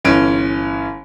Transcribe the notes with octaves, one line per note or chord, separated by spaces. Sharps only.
G1 E3 C#4 D7